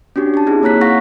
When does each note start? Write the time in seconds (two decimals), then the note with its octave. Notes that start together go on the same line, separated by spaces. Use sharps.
0.16 C#4 D4 F#4 G4
0.34 G4 A5
0.46 C4 D#4 E4 G#4
0.63 A#3 C#5 A#5 F#6 B6
0.81 F5 F#5 C#6 F#6 A#6 B6